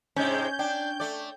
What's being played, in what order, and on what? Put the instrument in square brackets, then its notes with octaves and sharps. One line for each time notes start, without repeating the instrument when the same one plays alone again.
[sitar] G#2 C3 G#3 [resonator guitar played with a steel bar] C#4 [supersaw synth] G6
[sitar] D4 [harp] G5
[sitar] A3 D5